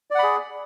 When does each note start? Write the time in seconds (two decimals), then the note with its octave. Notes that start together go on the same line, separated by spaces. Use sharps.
0.11 D5
0.15 F#5
0.19 B5
0.23 G#4